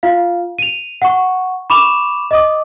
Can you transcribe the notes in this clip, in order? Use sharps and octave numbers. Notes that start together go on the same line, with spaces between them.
F4 F5
D#7 F7
F#5 C#6
B5 C#6 D6 E7 F7
D#5 D6 D#6